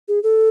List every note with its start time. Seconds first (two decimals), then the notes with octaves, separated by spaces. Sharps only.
0.08 G#4
0.23 A4